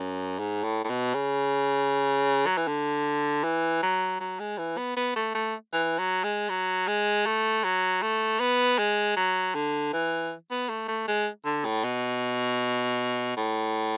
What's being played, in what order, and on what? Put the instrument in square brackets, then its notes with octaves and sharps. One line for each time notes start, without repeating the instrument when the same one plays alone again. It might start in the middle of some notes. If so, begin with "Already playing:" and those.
Already playing: [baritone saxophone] F#2
G#2
A2
A2
B2
C#3
F#3
E3
D3
E3
F#3
F#3
G#3
E3
B3
B3
A3
A3
E3
F#3
G#3
F#3
G#3
A3
F#3
A3
B3
G#3
F#3
D3
E3
B3
A3
A3
G#3
D3
A2
B2
A2